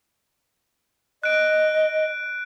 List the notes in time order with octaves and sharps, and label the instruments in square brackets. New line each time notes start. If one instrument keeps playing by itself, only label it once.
[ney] D#5 [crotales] F#6 D7